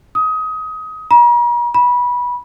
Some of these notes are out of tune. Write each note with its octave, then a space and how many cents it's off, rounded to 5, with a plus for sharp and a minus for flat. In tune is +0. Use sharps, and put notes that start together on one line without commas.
D#6 +25
A#5 +45
B5 -20